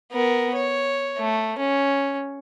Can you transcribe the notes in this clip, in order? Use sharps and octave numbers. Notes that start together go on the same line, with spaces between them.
B3 A#4
C#5
A3
C#4